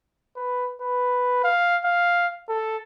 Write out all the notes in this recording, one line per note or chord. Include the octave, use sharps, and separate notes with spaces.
B4
B4
F5
F5
A4